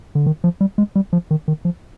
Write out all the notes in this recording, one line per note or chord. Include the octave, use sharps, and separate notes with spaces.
D3
D#3
F3
G3
G#3
G3
F3
D#3
D#3
F3